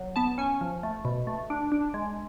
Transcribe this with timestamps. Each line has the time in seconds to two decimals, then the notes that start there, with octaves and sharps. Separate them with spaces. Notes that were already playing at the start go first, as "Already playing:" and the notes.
Already playing: F#3
0.16 B3 A5
0.38 C#4 G#5
0.61 F3
0.83 A3
1.05 B2
1.27 A3
1.50 D4
1.72 D4
1.94 G#3